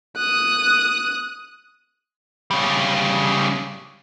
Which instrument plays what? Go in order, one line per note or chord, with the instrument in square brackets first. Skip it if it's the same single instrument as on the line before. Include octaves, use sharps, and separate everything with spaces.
[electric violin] D#6 F#6
[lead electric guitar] C#3 G3